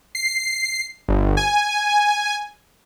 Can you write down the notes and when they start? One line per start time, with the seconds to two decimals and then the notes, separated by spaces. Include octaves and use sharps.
0.15 C7
1.08 G1
1.37 G#5